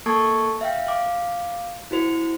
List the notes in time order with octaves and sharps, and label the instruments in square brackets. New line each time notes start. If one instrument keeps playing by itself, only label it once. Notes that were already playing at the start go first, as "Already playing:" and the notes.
[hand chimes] A#3 A4 A5 C#6 G#6
E5 F5 G5
F5 D6
E4 F#4 C5